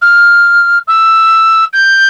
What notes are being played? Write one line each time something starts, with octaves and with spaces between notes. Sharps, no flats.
F6
E6
G6